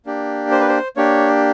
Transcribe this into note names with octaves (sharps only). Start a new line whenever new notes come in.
A#3 D4 G4
C5
B4
C5
A#3 D4 G4 C#5